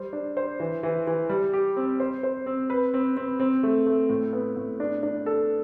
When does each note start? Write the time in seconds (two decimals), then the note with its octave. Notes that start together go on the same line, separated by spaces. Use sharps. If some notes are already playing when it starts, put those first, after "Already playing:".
Already playing: G3 C5
0.13 D4
0.37 C5
0.60 E3
0.83 E3
1.07 E3
1.29 G3
1.53 G4
1.77 C4
2.00 C5
2.23 C5
2.46 C4
2.70 B4
2.94 C4
3.17 C4
3.40 C4
3.63 A3
3.86 A3
4.09 A2
4.33 B3
4.56 A2
4.80 D4
5.03 D4
5.26 A4